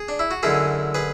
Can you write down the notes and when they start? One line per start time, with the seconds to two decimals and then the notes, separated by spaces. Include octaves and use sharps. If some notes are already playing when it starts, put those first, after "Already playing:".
Already playing: G#4
0.09 D4
0.19 E4
0.31 F#4
0.43 F#2 D3 G#3 E4 G#4
0.95 G#4 B4